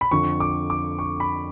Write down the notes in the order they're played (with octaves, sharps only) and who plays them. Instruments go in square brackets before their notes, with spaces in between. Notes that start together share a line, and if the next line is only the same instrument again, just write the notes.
[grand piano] B5
F2 D3 F3 C#6
D6
D6
C#6
B5